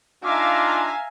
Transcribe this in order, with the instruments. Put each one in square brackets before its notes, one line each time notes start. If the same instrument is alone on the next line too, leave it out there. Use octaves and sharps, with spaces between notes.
[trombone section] D4 D#4 F4 [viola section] E5 F5 A#5 [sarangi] G#5 [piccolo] D6